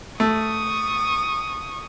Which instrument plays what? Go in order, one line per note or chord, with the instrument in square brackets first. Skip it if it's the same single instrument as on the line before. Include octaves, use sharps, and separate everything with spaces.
[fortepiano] A3 [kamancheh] C#6 D#6